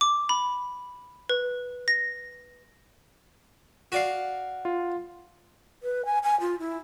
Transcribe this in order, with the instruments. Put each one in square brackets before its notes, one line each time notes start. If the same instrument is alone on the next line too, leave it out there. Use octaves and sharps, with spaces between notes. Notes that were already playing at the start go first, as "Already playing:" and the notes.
[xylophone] D6
B5
B4
A#6
[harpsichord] F#4 D5 F5
[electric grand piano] F4
[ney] B4
G#5
G#5
F4
E4